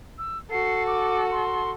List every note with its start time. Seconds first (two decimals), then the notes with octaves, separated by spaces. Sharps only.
0.18 E6
0.51 F#4 A4 C7
0.87 D6
1.31 C6